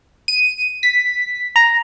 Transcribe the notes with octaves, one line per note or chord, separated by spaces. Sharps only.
D#7
B6
A#5